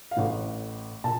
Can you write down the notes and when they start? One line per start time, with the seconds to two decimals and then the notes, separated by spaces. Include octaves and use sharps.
0.11 F5
0.16 A1 A2 F#5
1.04 A#2 A5